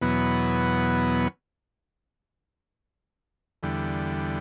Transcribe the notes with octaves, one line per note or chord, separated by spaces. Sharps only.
E2 B2 F#3 B3
E2 D3 G3